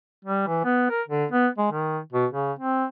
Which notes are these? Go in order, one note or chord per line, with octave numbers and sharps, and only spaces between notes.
G3
E3
B3
A#4
D3
B3
G#3
D#3
B2
C#3
C4